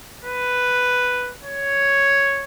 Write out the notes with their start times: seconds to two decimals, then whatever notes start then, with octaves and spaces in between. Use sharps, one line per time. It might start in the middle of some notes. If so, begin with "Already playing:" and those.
0.25 B4
1.44 C#5